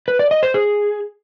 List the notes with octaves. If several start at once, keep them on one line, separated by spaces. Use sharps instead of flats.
B4
D5
D#5
C5
G#4